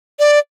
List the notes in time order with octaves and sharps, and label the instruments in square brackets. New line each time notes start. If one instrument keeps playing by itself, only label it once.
[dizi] D5